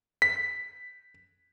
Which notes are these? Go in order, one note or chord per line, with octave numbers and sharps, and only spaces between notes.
B6